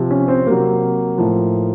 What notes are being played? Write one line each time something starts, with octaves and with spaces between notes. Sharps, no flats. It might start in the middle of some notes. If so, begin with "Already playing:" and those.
Already playing: C3 F3
C#4
C4
C3 F#3 A#3
A2 F3